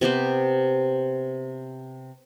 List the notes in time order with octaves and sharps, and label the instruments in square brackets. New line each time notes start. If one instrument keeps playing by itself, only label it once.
[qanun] C3 B3 G4 C5